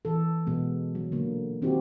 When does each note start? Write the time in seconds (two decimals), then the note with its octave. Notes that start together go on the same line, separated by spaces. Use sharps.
0.05 E3 A4
0.47 B2 G#3 B3
0.95 F#3
1.12 D3 A#3
1.62 D#3 C4 D#4 E4 F#4 G4